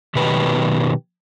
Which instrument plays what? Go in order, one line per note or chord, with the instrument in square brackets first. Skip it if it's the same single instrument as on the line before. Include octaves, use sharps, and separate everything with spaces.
[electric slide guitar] B2 D#3 F#3 D#4 G4 B4